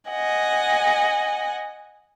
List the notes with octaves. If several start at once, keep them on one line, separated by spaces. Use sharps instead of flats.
D#5 F#5 G#5